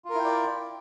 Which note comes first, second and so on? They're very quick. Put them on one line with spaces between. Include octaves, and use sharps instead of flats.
F4 A#4 E4 G5 D5